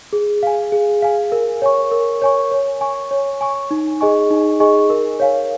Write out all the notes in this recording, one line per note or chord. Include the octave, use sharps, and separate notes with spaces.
G#4
F5 G#5
G#4
F5 G#5
A#4
C#5 G#5 C#6
A#4
C#5 G#5 C#6
C#5
G#5 C#6
C#5
G#5 C#6
D#4
G#4 D#5 G#5 C#6
D#4
G#4 D#5 G#5 C#6
A#4
C#5 F5 G#5